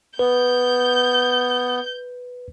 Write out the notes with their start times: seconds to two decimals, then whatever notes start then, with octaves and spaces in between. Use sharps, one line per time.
0.19 B3 B4 G6